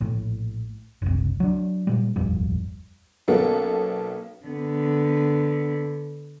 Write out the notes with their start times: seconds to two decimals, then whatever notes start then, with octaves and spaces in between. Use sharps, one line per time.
0.01 A#1 A2
1.02 F#1 C2
1.40 F#3 D4
1.87 A#2 G3
2.16 D#1 G#1 F2 G3
3.28 B1 A#3 B3 C#4 A4
4.46 D3 B3